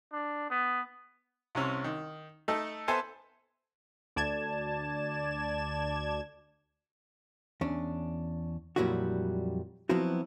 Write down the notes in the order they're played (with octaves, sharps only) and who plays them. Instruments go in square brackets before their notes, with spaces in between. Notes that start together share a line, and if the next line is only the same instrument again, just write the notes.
[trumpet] D4
B3
[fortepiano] C2 C3 C#4
D#3
A3 D#4 A4
B3 A4 C5 E5 G#5 A5
[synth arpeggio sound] D2 D5 A5 G#6 E7
[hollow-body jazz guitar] E2 C#4 D4
F2 A#2 F#3 G3 E4 F#4
F3 F#3 B3 C4 E4 F#4